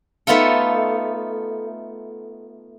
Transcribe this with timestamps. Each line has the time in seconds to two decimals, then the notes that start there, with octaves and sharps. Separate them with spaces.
0.27 A3 B3 D#4 F4 A4